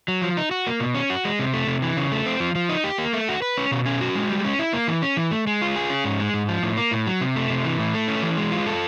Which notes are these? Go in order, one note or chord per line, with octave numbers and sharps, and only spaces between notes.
F#3
F3
D#4
F#4
A#3
B2
C#4
F#4
G#3
C3
A3
C3
E3
C#3
A3
C4
F3
F3
D#4
G4
A#3
A3
F#4
B4
C#4
B2
C#4
F#4
G#3
G3
C#4
E4
A#3
E3
C#4
E3
A3
G#3
F4
G#4
C#4
G#2
G#3
G#2
F3
A2
A#3
A2
F#3
C3
A3
C3
E3
A2
A3
C#4
E3
G#3
F4
A4